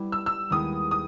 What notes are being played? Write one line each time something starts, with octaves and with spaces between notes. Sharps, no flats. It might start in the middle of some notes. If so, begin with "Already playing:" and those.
Already playing: G3 B3 E4 G4
E6
E6
D#2 D#3 G#3 B3 E4 D#6
D#6